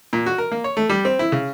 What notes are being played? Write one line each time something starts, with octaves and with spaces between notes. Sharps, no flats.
A#2
F#4
A#4
A#3
C#5
A3
G3
C4
E4
C#3